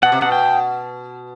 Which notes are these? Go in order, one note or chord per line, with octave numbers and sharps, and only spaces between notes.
B2 F#5
C3
B2 F#5
G5